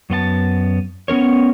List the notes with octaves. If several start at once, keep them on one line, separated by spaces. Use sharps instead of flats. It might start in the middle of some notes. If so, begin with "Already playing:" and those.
F#2 B3 F4 A5
B3 C#4 A#4 C#5